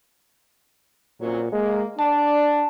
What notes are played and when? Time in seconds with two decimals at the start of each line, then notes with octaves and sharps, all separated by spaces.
1.21 A#2 F#3 C4 C#4
1.52 G#3 A#3
1.99 D4 D5 A5